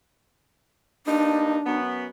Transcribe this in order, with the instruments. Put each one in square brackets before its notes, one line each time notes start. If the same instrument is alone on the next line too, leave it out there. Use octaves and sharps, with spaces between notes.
[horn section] G2 A#3 D#4 [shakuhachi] D4
[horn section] F#2 B3